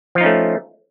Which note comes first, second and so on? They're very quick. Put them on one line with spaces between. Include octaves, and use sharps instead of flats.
F3 F4 D#4 C#4 A3